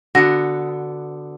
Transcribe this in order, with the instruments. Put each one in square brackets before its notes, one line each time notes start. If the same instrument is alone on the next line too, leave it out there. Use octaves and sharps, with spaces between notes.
[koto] D3 B3 [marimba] F#4 F#5 A#6